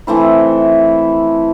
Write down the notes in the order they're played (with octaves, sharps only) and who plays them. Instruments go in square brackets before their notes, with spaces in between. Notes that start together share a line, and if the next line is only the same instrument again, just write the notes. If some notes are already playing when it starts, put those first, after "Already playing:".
[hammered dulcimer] E3 A3 C4 E4